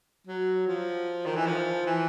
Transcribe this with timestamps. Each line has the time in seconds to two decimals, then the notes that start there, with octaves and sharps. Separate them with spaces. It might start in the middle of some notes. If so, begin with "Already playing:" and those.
0.27 F#3
0.67 F3
1.26 D#3
1.36 E3
1.46 F3
1.86 E3